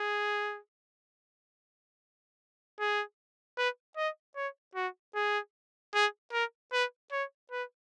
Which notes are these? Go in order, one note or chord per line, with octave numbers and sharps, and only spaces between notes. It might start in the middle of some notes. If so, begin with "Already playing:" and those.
Already playing: G#4
G#4
B4
D#5
C#5
F#4
G#4
G#4
A#4
B4
C#5
B4